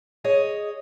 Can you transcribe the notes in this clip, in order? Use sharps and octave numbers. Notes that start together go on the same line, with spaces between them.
G#4 C#5 D#5